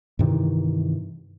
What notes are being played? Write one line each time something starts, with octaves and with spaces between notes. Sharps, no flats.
G2 C3 D#3 E3